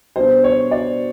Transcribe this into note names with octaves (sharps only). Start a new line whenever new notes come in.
B2 G3 B3 D4 C5
C#5
D5